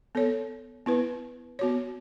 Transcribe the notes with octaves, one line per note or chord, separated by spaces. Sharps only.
B3 A4 C#5
B3 E4 B4
B3 F#4 C#5